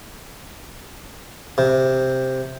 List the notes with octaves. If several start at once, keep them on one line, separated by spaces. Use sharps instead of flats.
C3